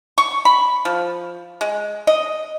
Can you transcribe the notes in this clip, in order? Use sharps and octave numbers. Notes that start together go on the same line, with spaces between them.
C#6
B5
F3
G#3
D#5